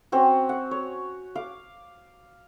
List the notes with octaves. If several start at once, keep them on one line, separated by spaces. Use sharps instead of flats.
C4 C#4 F#4
F#5
C#5
F5 D6